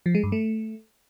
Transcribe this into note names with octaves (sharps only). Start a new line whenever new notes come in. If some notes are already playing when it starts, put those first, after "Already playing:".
F3
G#3
G2
A3